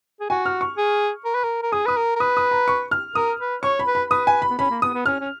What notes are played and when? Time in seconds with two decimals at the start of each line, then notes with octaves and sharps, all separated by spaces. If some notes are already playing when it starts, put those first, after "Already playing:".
0.20 G#4
0.30 F#4 G#5
0.46 F6
0.61 C#6
0.77 G#4
1.25 A#4
1.35 B4
1.44 A#4
1.63 A#4
1.72 G#4 D#6
1.86 B4 D#6
1.97 A#4
2.16 A#4
2.20 B4 D#6
2.37 D#6
2.51 A#5
2.68 C#6
2.91 F6
3.15 A#4 D#6
3.39 B4
3.63 C#5 C#6
3.79 B5
3.87 B4
3.95 B5
4.11 B4 D#6
4.27 G#5
4.42 B5
4.50 B3
4.59 C#4 B5
4.70 A#3
4.82 B3 D#6
4.94 B3
5.06 C#4 F6
5.20 C#4